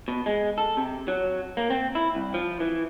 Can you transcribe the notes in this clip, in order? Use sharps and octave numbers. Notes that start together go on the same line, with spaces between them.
B2
G#3
A4
C3
F#3
A#3
C4
E4
C2
F3
E3